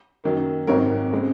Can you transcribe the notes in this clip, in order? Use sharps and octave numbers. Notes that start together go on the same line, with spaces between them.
F#2 D#3 F#3 A#3
G#1 G#2 D#3 F#3 C4 A#4 C#5
C#3 G#3 C4